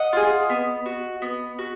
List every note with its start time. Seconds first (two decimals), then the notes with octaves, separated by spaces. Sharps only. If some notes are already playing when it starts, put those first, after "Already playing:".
Already playing: D#5 F#5
0.13 F4 G#4
0.50 B3
0.86 F#4
1.22 B3
1.59 F#4